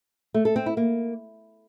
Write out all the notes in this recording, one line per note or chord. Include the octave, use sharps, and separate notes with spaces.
A3
A4
C4
E4
A#3